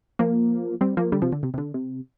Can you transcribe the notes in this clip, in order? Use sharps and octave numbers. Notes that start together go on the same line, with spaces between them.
F3 A#3
G3 C4
F3 A#3
D3 G3
C3 F3
D3
C3
C3
D3
C3